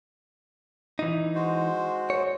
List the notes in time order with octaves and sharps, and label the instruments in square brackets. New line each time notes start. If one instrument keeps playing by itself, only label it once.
[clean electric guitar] E3 D#4
[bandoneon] G#3 F#4 C5
[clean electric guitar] C#5